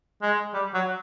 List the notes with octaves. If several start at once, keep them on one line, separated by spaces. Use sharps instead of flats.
G#3
G3
F#3